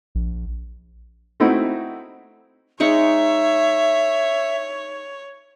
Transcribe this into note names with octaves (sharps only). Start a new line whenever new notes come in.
A#1
A3 C4 D#4 E4 F#4
G#3 D#4 C#5 E5 C#6